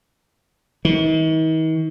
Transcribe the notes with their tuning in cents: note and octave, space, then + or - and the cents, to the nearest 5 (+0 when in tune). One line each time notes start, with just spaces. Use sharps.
D#3 +45